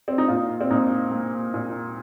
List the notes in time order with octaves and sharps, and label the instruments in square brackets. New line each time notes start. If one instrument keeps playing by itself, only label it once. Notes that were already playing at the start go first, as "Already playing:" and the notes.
[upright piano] C4
D#4
A#2 F4
C4
A#2 D#4
A#3
A#2